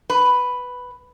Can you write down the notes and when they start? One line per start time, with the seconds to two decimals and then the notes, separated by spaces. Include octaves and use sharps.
0.10 B4